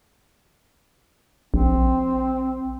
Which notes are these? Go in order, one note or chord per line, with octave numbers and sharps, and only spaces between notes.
A#1 C4